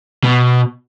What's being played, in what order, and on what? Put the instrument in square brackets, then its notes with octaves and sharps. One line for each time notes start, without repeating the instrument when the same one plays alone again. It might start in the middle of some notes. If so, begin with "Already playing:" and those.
[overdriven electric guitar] B2